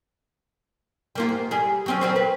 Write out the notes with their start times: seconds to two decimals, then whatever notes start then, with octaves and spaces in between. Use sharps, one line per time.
1.15 G3 A#3 F4
1.29 G#2
1.51 G3 G#4
1.86 F#3 C4 C#4
2.01 F#3 G3 C4
2.16 B4